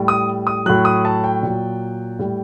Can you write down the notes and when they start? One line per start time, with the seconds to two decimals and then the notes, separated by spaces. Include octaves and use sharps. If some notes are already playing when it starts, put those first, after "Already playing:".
Already playing: A2 G3
0.08 D#6
0.47 D#6
0.66 A2 F#3 F#6
0.85 D#6
1.05 A5
1.24 G5
1.43 A#2 F#3
2.19 A2 G3